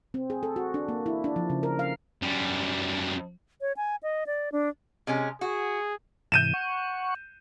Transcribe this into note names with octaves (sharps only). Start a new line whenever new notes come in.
C4
G#4
A4
F#4
D4
A#3
E4
D4
F3
C#3
A#4
F5
F#2 G3
C#5
G#5
D#5
D5
D4
C3 G#3 C#4
F#4 G#4
G#2 C3 E3 G6 D#7 E7
F#5 C#6